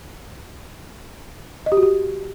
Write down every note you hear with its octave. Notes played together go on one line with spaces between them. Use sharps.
D#5
G4
F#4
G4